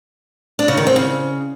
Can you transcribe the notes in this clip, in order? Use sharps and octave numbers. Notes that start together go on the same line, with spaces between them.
D4
C#3
D#3
C4
C#3